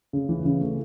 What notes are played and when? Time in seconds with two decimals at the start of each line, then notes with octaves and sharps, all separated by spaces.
0.13 C#3
0.29 E3
0.45 C#3
0.61 A3